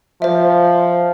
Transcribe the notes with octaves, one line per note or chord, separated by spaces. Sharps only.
F3 C5 E5